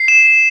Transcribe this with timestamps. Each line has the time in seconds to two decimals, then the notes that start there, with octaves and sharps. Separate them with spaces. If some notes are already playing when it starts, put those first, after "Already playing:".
Already playing: C7
0.08 E7